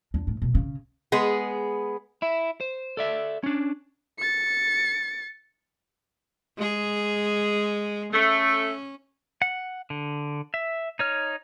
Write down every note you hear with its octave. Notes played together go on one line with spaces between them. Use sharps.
E2 D4
A2
F#2 B2
C#3
G#3 B3 G#4
E4 E5
C5
A4 D5 E5
C#4 D4
A6 C#7
G#3 G#4
A3 C#4
F#5
D3
E5
D#4 C#5 F6